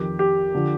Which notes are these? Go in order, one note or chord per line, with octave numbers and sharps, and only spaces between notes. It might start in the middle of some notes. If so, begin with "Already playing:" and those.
Already playing: F2 D#3 G4
G4
D3 F3